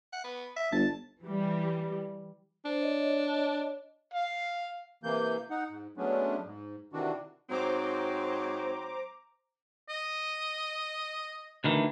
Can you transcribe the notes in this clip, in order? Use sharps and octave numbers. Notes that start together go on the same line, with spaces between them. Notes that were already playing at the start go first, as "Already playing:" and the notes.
F#5
B3
E5
G1 A5
E3 G3
D4 C5
C#5 D#5
F5
C3 E3 A#3 G6
D#4 F#5
G#2
F#3 G#3 A3 B3 C#4 D4
G#2
C3 D#3 E3 D4 F#4
G#2 F#3 C4 C5 A#5 D6
D#5
D2 D#3 E3